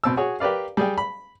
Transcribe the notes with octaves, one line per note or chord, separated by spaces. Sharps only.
B2 C4 A5 E6
F#4 G#4 C#5
G4 A#4 B4 D5 F5
G3 G#4 G5
B5